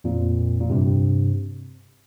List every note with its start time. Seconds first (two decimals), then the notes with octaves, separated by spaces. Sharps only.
0.04 F2 A#2
0.61 A#2
0.70 G2 C3